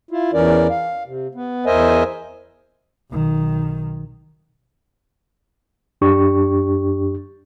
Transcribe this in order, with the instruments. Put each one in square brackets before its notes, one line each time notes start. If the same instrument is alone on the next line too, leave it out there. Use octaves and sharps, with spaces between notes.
[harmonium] E4 F4
E2 E3 C#4 A#4 D5
F5
C3
B3
E2 A#4 C5 D#5 E5 G#5
[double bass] B1 D#3
[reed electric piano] F#2 D4 G4 C#6